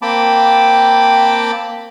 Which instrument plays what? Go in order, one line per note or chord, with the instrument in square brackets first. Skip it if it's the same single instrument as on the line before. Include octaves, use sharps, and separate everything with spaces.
[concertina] A#3 C4 G5 A5 B5 D6